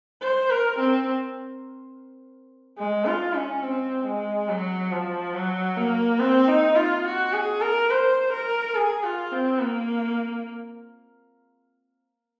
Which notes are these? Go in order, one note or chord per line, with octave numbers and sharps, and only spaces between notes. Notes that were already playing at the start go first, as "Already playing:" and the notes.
C5
A#4
C4
G#3
F4
C#4
C4
G#3
F#3
F3
F#3
A#3
C4
D#4
F4
F#4
G#4
A#4
C5
A#4
G#4
F4
C4
A#3